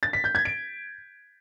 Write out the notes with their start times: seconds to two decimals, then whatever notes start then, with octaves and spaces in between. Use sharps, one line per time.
0.03 A6
0.13 B6
0.24 G6
0.35 G#6
0.45 D7